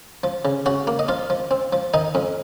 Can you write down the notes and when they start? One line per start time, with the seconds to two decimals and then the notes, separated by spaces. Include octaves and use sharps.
0.24 F3
0.45 C#3
0.66 C#3 F#4 F#5
0.87 A#3
0.99 D#5
1.08 F3 F4 F5
1.30 F3
1.51 C4
1.73 F3
1.94 D#3 D#4 D#5
2.15 F2